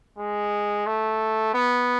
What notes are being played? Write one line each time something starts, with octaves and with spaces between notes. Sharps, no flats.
G#3
A3
B3